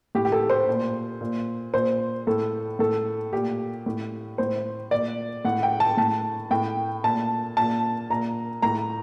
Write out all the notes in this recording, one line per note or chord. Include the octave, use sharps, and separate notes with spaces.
A2 G4
G4
A4
C5
A#2
A#2
A#2 C5
A2 A4
A2 A4
A#2 G4
A2
A2 C5
A#2 D5
A2 F#5
G5
A5
A2 A5
A2 G5
A#2 A5
A#2 A5
A#2 A#5
A2 A#5